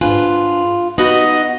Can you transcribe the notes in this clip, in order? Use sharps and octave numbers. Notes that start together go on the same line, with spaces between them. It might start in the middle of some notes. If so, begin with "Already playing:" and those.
G#2 D4 F4 B4 G#5
B3 D#4 F#4 D#5 F#5 B5